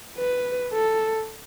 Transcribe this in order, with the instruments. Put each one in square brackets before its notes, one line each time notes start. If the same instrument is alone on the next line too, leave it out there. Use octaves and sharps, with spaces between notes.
[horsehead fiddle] B4
A4